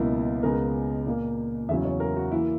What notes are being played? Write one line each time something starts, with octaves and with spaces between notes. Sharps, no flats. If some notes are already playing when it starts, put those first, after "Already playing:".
Already playing: C#2 B2 F#3 A#3 E4
C#2 C#3 G#3 B3 A#4
A#2 A#3
E2 C#3 F#3 E5
C#5
A#4
F#4
E3 A#3 E4